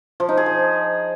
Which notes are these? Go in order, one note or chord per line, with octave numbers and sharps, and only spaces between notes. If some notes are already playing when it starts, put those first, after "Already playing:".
F3
D#4
G#4
F3